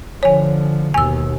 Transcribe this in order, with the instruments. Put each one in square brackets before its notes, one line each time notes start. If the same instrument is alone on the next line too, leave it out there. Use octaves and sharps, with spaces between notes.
[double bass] D3 F3 [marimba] C#5 G#5
[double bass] D#2 B2 [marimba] G#5 E6